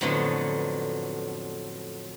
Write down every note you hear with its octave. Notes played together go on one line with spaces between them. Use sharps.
F2 A2 D3 F#3 B3